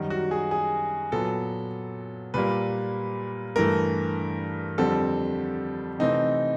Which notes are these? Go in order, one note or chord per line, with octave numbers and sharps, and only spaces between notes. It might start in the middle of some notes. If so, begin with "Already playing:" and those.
Already playing: F#2 D#3 G3
F#4
G#4
G#4
A#2 F#3 B3 A4
A#2 G3 A#3 B4
G2 E3 A3 A#4
F2 D3 G3 C4 A4
C3 E3 A3 C4 D#4